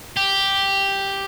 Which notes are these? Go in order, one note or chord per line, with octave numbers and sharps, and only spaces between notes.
G4